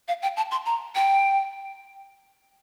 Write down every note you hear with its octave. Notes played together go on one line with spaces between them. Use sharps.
F5
G5
A5
C6
A#5
G5